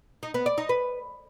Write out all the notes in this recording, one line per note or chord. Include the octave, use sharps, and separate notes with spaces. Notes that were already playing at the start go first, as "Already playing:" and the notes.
D#4
B3
D5
D#4
B4